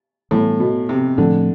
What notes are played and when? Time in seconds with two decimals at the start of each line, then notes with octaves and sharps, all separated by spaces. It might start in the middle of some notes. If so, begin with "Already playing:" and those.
0.31 A2 E3 G3 B3
0.60 B2
0.89 C3
1.18 A2 D3 F3 A3 C4